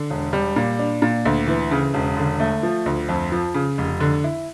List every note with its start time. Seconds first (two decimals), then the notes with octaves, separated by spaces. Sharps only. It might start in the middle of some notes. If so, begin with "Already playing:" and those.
Already playing: D3
0.10 E1
0.33 G3
0.56 A#2
0.79 D4
1.02 A#2
1.25 D2
1.47 E3
1.71 C#3
1.94 E1
2.17 D3
2.40 A3
2.63 F3
2.86 D2
3.09 F2
3.32 F3
3.54 C#3
3.78 F1
4.00 D3
4.24 E4